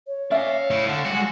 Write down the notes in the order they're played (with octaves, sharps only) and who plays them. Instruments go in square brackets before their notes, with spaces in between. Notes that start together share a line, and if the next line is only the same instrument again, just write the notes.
[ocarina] C#5
[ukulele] C#4 E5 [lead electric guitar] D5 F5
[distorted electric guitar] A3 E4
[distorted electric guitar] D3 [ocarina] F#5
[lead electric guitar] G3 G#3 [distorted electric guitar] F#4